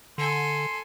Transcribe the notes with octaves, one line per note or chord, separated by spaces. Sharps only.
D3 A4 G#5 C6